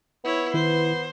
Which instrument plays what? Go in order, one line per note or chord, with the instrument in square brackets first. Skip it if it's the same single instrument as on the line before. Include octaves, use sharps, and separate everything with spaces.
[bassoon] B3 [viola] E4 C#5
[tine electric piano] D#3 E4 B4 [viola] C5